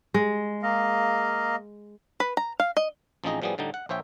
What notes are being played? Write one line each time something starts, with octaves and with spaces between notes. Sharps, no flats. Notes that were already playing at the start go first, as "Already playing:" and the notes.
G#3
A#3 D#5 F5
B4
A#5
F5
D#5
A1 F3 C4 D#4 G#4 D#5
A2 F3 G3 B3 G#4
A2 D3 G3 D#4
F#5
A#1 C5 C#5 E5 G5